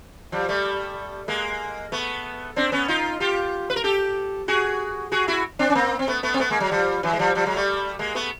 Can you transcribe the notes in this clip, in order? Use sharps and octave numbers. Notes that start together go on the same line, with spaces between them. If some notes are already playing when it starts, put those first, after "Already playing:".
F3 G3
G3 A3
G#3 A#3
A3 B3
C4 D4
B3 C#4
D#4 F4
F4 G4
B4
A#4
G4 A4
F#4 G#4
F#4 G#4
E4 F#4
C4 D4
C#4
A#3 C4
C4
A3 B3
A3 B3
C4
A3 B3
G#3 A#3
F#3 G#3
F3 G3
E3 F#3
G#3
F3 G3
F3 G3
F#3 G#3
G3 A3
G#3 A#3
A3 B3